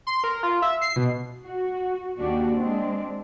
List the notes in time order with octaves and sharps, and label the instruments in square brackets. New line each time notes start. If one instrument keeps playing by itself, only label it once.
[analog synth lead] C6
A#4
F4
E5
C7
B2
[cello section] F#4
D#2 D4 F#4 G4
G#3 C4 D4